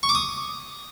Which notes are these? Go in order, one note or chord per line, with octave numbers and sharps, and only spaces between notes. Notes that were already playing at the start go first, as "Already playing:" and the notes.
C#6
D6
D#6